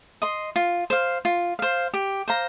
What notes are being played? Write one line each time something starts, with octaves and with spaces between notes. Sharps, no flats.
D#5 C6
F4
C5 F5
F4
C5 F5
G4
C5 F5 A#5